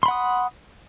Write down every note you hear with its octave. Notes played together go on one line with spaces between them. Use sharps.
F#5 B5 C6 D#6